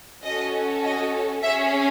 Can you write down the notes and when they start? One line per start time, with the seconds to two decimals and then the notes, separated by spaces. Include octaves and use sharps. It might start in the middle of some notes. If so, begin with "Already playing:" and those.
0.23 C#4 F#4 A4 D#5
0.83 D#5
1.42 C#4 G#4 E5